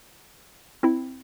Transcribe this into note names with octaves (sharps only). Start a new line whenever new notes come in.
C4 E4